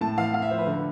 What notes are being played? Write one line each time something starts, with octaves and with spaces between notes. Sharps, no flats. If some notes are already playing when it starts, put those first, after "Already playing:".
A2 A5
E3 F5
A2 F5
E5
F3 C5
B4
D3
B5